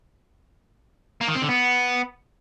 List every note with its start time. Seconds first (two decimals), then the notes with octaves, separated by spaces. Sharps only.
1.21 A#3
1.28 D#3
1.35 C4
1.42 D3
1.49 B3